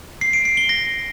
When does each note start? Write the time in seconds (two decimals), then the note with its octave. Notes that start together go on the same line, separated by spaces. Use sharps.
0.21 C7
0.33 D7
0.45 C7
0.57 G7
0.69 A#6